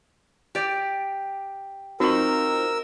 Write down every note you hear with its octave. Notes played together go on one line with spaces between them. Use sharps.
G4 D5
C4 D#4 F4 F#4 A#4 C#6 E6